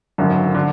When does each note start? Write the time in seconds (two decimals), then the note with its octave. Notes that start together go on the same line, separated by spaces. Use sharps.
0.18 G#1 F#2 D3
0.55 D3